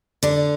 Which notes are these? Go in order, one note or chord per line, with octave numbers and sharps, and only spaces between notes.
D3 D4